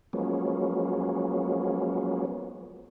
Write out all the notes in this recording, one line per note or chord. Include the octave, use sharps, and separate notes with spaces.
F3 F#3 G#3 A#3 B3 C#4